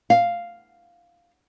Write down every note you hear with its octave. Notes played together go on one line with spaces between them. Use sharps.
F5